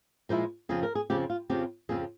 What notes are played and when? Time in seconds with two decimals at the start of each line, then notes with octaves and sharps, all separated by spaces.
0.29 A#2 F3 G#3 E4 C5
0.69 F2 C#3 F3 C4 G#4
0.83 A#4
0.95 G#4
1.10 F2 C#3 F3 C4 G4
1.30 F4
1.50 F2 C#3 F3 C4 G4
1.89 F2 C#3 F3 C4 G#4